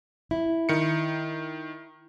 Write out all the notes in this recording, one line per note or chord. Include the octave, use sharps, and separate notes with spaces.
E4
D#3 C#7